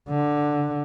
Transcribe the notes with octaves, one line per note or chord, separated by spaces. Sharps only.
D3